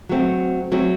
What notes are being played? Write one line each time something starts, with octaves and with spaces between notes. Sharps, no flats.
F#3 A3 C4
F#3 A3 C4